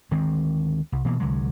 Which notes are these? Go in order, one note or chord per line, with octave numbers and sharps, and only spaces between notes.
D2 D#3 G#3 C4
C2
B2 E3 A#3
C2 D3 F#3 G#3